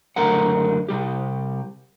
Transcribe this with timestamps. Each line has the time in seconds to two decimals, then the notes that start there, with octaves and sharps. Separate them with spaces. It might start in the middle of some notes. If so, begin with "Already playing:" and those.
0.16 C#2 F#2 D3 A3 A#4 F#5
0.89 C3 G3 G4